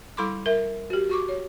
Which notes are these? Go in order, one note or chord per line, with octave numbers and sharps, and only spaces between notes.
G3 E4 A4 B5 C6 D6
A#4 E5
F#4 G4
F#4 C#6 D6
C#5